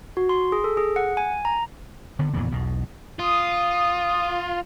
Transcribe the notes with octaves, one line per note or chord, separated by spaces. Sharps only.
F#4
C6
G#4
A4
G#4
F#5
G#5
A#5
D3 D#3 B3
F2 A#2 E3 B3
B1 E2 B2
F4 D#6